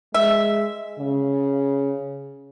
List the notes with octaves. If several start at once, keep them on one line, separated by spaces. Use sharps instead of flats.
G#3 E5
C#3